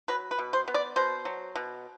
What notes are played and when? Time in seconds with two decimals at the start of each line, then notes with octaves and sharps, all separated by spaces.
0.08 F#3 B4
0.31 B4
0.39 B2
0.53 C5
0.68 B3
0.74 D5
0.96 B2 C5
1.25 F#3
1.55 B2